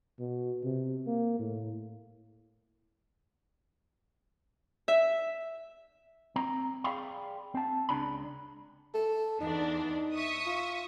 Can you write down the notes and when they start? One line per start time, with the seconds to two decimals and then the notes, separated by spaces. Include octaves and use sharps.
0.20 B2
0.64 C3
1.07 A#3
1.39 A2
4.88 E5
6.36 C4 A#5
6.84 G#4 D5 F5 G5 B5 C6
7.55 C4 A5
7.89 C#2 C#3 D4 D5 A#5 B5
8.94 A4
9.41 E2 D4 D#4
10.15 E5 C#6 D#6
10.46 F4